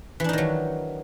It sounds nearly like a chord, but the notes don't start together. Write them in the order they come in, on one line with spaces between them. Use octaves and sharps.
E3 D4 D#4 D#3 F#3